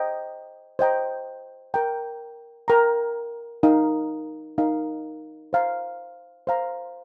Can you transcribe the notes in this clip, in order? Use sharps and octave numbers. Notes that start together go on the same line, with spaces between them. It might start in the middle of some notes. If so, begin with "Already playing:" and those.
Already playing: C5 D#5 G5 A#5
C5 D#5 G5 A#5
A#4 G5 A#5
A#4 G5 A#5
D#4 A#4 F5
D#4 A#4 F5
C5 F5 A#5
C5 F5 A#5